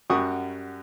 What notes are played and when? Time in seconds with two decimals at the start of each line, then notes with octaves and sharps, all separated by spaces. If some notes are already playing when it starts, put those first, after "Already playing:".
0.10 F#2 G3 F#4 G4 C#6 D#6